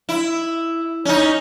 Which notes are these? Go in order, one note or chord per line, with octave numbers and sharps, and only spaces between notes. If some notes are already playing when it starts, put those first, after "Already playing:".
E4
C#4 D#4